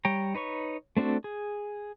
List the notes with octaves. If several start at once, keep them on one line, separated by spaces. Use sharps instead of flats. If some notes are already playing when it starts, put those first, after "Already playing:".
G3 C#5 G5 A#5
D#4 B4 C#5 C#6
A3 C4 D4 F#4 A4
G#4